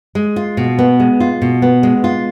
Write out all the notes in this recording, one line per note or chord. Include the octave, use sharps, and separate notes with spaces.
G#3
F4
B2
B3
G#3
F4
B2
B3
G#3
F4